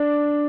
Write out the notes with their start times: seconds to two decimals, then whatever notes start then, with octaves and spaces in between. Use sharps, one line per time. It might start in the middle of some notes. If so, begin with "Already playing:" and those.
Already playing: D4